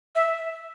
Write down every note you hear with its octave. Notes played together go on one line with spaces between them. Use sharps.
E5